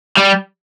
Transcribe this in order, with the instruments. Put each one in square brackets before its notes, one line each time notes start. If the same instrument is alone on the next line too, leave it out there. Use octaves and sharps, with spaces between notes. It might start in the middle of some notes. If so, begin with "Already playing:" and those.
[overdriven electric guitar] G3